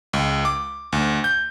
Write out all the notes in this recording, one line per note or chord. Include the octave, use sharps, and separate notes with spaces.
C#2
D6
D2
G6